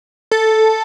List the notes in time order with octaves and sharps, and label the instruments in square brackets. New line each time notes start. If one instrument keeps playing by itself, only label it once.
[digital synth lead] A4